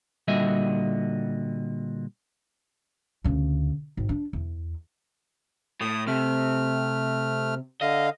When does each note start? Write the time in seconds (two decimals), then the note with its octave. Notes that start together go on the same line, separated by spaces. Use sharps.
0.28 A#2 D3 G3 F#4 D#5 E5
3.24 D2 C#3
3.97 G#1
4.09 D4
4.33 E2
5.81 A2 D#6
6.07 C3 A3 F6
7.82 D3 D#5 F5